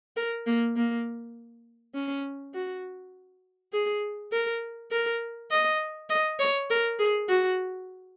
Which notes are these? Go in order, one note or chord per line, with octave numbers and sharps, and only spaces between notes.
A#4
A#3
A#3
C#4
F#4
G#4
A#4
A#4
D#5
D#5
C#5
A#4
G#4
F#4